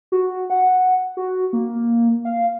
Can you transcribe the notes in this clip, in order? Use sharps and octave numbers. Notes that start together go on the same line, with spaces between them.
F#4
F#5
F#4
A#3
F5